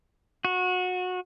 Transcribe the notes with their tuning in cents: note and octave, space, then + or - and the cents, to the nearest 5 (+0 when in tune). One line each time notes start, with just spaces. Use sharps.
F#4 -25